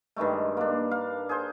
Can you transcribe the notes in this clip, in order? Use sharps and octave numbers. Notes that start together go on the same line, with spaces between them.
G2 D#3 G#3 A3
A#3 D4
F5
G#4 C5